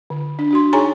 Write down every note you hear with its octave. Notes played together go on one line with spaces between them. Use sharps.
D3
D4
D4 F#4 C6
D#4 G#4 C#5 G#5 A#5